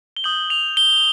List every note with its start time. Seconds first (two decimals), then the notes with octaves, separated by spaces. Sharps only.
0.17 G7
0.24 D#6 G6 F#7
0.50 F7
0.77 G7